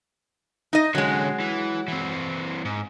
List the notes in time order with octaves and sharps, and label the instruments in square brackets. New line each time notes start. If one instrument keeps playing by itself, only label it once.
[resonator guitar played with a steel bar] D#4 D#5
[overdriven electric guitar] D3 C#4 [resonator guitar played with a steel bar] F#3 G#3
[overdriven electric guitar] E3
E3 C4
G#2